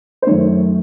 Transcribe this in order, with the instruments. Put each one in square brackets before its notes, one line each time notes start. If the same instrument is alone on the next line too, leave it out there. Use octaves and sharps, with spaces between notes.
[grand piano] C5
F#2 D#3 A3 C#5